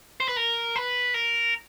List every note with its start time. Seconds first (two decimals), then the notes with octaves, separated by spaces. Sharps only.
0.20 C5
0.28 B4
0.37 A#4
0.76 B4
1.14 A#4